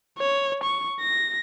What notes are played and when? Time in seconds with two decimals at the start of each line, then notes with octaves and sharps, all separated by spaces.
0.18 C#5
0.64 C#6
1.01 A#6